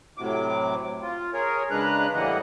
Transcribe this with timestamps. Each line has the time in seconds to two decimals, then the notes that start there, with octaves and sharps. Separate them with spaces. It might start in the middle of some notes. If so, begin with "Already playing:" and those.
0.18 A2 C3 F#3 D6
1.02 F4
1.33 G#4 A#4 C#5
1.71 C#3 G#3 D4 B4 A#5 F#6
2.14 A2 E3 G3 A#3 D#5 F#5